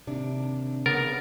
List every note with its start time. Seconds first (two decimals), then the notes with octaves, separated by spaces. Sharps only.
0.07 D#2 C3 D4
0.86 C#3 B3 A#4 A6